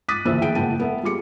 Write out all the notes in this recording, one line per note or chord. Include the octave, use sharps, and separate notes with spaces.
D6 D#6 F#6 A6 B6 D#7
F#1 D2 E3 C5 E6 D#7
E3 E4 G#4 G5 D7
F#1 F#5 G5 A5 D#7
B3 A4 B4 E5
G3 F4 G#4 D6 C#7